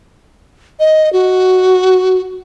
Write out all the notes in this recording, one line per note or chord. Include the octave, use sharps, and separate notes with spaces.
D#5
F#4